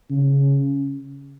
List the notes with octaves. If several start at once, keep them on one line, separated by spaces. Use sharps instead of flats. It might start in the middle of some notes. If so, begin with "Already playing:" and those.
C#3